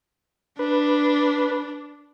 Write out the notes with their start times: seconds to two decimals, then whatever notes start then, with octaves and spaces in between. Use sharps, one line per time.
0.59 D4 B4